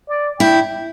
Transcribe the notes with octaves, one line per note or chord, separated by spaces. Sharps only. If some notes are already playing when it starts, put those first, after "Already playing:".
D5
E4 G5